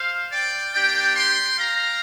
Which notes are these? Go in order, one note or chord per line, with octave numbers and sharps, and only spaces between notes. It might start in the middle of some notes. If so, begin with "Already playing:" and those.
Already playing: C5 F5
D5 G5
A#3 D4 G4 D5 G5
G5 C6
F5 A#5